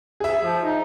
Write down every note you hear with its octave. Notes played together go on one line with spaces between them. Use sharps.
G#4 E5
F3
D#4